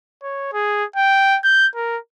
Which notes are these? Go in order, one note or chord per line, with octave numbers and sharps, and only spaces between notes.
C#5
G#4
G5
G6
A#4